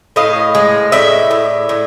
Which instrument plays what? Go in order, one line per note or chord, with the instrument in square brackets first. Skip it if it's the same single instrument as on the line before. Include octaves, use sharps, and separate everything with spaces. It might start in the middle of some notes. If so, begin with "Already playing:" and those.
[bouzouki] A2 D#5 F5
G#3
A2 D5 E5
A2
A2